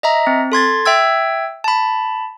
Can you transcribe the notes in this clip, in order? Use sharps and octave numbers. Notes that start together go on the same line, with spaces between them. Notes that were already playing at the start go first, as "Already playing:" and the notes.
D#5 E5 A#5
C4
A4 C6 G#6 A6
E5 G5 E6 G#6
A5 B5